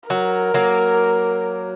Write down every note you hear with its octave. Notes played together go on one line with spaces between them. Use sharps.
F#3 A#4
F#3 A#3